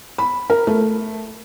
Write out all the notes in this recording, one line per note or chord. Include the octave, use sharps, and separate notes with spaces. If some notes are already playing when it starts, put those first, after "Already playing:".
B5
A#4
A3